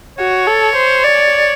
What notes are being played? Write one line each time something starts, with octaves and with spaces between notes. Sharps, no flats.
F#4 C#5
A4
C5
D5